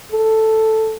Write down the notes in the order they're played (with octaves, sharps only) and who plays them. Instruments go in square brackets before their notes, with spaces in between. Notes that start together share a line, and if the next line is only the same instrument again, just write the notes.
[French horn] A4